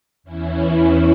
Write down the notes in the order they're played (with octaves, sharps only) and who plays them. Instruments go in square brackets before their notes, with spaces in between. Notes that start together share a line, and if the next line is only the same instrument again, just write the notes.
[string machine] E2 E3 C#4 E4